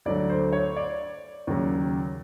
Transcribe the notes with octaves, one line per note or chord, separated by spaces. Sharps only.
D2 D3 F#3 D5
C5
C#5
D5
D#2 C#3 F#3